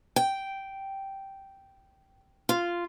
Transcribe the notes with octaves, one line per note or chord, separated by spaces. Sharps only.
G5
F4